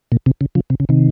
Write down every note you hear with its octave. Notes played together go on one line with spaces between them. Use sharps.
A#2
C3
C#3
C#3 F3
C3
C#3
C3 D#3